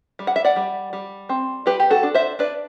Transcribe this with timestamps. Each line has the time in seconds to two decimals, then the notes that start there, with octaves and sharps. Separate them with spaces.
0.19 G3
0.27 F#5
0.36 E5
0.44 D5 F#5
0.56 G3
0.93 G3
1.29 C4
1.66 G3 G4 B4
1.80 G4
1.90 F#4 A4
2.03 D4
2.14 C5 E5
2.39 D4 B4 D5